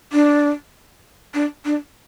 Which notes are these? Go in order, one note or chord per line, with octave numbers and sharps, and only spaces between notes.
D4
D4
D4